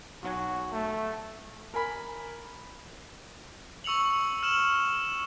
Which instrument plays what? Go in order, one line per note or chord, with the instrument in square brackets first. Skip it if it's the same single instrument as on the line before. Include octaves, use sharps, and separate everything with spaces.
[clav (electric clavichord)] B1 F#3 G#5 [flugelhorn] F#4
[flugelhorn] A3
[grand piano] A#4 G#5 B5
[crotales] C#6 E6 C#7 F7 F#7
F6 E7 F#7